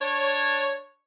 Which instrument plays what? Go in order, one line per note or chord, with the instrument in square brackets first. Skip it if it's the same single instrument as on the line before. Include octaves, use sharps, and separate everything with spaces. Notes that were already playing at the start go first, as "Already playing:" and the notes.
[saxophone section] D4 C#5